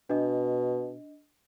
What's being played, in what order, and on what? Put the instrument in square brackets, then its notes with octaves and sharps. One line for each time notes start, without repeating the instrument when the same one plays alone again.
[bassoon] B2 [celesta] D4 D#5